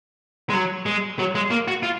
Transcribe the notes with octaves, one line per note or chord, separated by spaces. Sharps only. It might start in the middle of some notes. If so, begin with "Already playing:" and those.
G#3
F#3
G#3
F#3
G#3
A#3
F#4
F4